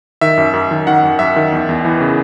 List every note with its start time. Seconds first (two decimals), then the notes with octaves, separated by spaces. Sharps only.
0.21 D#3 E5
0.37 F#2
0.53 F#2
0.71 D#3
0.87 D#3 F#5
1.03 F#2
1.19 F#2 E5
1.36 D#3
1.52 E2
1.69 E2
1.85 E3
2.01 C#3